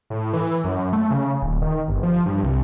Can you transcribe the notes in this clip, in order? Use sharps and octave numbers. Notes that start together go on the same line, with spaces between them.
A2
E3
F#2
A3
C#3
D#1
D#3
G1
F3
G2
C2